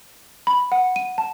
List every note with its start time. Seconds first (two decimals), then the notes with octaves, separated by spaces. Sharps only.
0.47 B5
0.72 F#5
0.96 D#7
1.18 A5